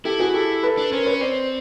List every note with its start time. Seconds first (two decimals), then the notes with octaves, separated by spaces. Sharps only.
0.05 E4 G4 A4
0.20 F#4 G#4
0.34 G4 A4
0.63 A4 B4
0.78 D4
0.92 C#4 A#4 C5
1.06 B4 C#5
1.21 C4 C5 D5